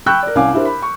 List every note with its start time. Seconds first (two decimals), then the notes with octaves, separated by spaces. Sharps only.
0.06 G5 B5 C#6 E6 F#6 G6
0.23 A#4 D5
0.35 C2 C#4 F5 G#5 D6
0.53 D4 E4 G4 A#4 C5
0.65 B5
0.82 C#6